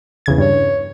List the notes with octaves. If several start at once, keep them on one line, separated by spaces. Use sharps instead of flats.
E2 C#3 G#6
G2 C#5